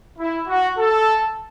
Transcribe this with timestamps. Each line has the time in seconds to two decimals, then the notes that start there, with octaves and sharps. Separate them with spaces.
0.18 E4
0.48 F#4
0.78 A4